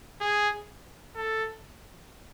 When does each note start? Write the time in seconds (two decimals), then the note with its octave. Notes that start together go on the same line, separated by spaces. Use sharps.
0.21 G#4
1.16 A4